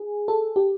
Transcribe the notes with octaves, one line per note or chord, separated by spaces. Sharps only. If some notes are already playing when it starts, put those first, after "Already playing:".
Already playing: G#4
A4
G4